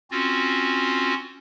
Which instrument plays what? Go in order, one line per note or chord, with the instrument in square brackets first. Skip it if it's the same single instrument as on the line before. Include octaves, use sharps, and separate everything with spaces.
[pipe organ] C4 C#4 F4 F#4